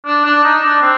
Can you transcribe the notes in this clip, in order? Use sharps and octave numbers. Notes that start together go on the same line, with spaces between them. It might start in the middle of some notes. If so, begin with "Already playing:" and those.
D4
D4
D#4
D4
C4